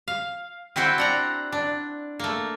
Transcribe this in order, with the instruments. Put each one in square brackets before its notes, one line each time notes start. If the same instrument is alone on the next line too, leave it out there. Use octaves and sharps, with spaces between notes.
[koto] F5
C4 E4 F#4 C5 G5
D4 F#5 A#5
D4
A3 A#3